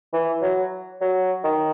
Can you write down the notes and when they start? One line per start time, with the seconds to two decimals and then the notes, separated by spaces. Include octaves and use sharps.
0.13 E3
0.42 F#3
1.01 F#3
1.44 D#3